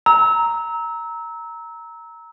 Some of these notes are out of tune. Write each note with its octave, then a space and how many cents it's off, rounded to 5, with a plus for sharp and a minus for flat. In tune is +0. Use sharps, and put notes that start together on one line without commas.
A#5 +0 E6 -25